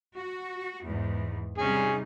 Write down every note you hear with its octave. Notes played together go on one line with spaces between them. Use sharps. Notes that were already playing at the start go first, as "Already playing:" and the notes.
F#4
E2 G#2
C3 G3 C#4 D#4 G#4